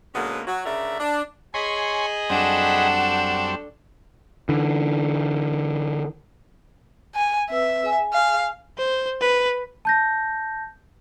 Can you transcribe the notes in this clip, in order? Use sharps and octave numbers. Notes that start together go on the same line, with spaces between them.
B2 D3 F#3 G#3 A#3 C#4
F#3 F#4
D2 C#3 A#4 D5 E5
D4
G#4 C#5 D#5 G#5 B5 C6
F#2 G3 C4 D4 A4 F#5
D3 E3
G#5
C4 B4 E5 E6
G#4 G#5
F5
C5
B4
A5 G6 A#6